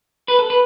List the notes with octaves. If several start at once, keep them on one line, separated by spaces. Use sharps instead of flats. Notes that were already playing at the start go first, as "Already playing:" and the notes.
B4
A4
B4